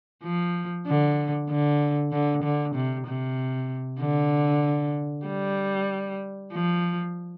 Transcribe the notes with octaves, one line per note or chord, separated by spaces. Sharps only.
F3
D3
D3
D3
D3
C3
C3
D3
G3
F3